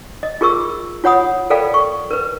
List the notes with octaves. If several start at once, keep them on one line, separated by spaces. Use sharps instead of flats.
D#5
F4 G#4 A#4 C#6 E6
F4 C#5 F#5 B5 D#6
A4 A#4 D5 F5 G5 B5
C#6
A#4 B4